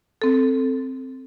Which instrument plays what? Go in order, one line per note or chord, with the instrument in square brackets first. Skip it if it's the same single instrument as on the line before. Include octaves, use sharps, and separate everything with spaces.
[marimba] C4 A4